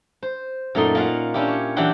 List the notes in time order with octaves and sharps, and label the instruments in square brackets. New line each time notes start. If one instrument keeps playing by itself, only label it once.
[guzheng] C5
F#2 A#2 A3 D#4 C6
A#3 C#4 F4 F5 F#5
C#4 D4 E4 F4 G4
C#5
E3 F#3 D4 G4 F#5 C6